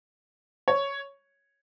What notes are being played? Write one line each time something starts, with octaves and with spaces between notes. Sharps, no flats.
C#5